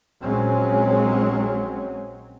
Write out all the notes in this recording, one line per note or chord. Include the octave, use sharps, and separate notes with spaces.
A#1 F#3 G#3 C4 C#4